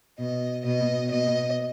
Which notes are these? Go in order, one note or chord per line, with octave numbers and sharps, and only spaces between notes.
B2 D#5
B2 D#5
B2 D#5